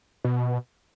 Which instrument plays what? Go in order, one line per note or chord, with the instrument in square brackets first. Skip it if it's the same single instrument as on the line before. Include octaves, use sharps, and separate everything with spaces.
[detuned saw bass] B2